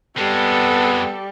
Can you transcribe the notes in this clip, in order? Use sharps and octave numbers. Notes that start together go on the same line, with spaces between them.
F2 G3 G#3 B3 A4